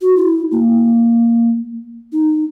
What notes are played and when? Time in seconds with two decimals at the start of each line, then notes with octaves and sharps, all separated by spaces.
0.02 F#4
0.17 E4
0.52 A#3
2.12 D#4